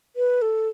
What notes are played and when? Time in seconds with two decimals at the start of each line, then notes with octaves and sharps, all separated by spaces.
0.16 B4
0.42 A4